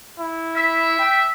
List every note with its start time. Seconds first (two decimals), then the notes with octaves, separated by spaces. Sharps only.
0.20 E4
0.56 E5
0.99 G5